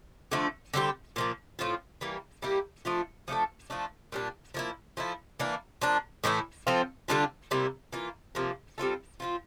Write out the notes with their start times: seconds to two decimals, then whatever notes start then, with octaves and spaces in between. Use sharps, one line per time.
0.32 D3 F3 A3
0.74 D3 G3 C4 G4
1.16 A#2 F3 A#3
1.59 A2 F3 C4 F4
2.01 E3 G3 A#3
2.42 G3 A#3 E4 G4
2.85 F3 A3 D4 F4
3.28 F3 A3 D4 A4
3.70 F3 A3 D4
4.12 A#2 G3 D4
4.54 F3 A#3 E4
4.97 F3 A3 E4
5.40 E3 A#3 D4
5.82 F3 A#3 D4
6.24 A2 E3 A3 E4
6.67 F3 C4 F4 A4
7.08 D3 G3 D4 F4
7.51 C3 G3 A#3 E4
7.93 E3 A#3 F4
8.35 C3 F3 A#3
8.78 G3 C4 F4 A4
9.20 F3 C4 F4